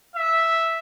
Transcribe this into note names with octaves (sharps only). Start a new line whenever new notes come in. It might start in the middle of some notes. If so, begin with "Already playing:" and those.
E5